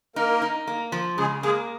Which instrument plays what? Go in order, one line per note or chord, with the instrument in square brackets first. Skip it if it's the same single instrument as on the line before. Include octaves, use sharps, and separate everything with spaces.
[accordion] A#3 A#4 [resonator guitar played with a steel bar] D#4
[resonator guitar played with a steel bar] D#4
A#3
F3
[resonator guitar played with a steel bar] C#3 [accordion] G#3 G#4
[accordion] G#3 G#4 [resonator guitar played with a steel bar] A#3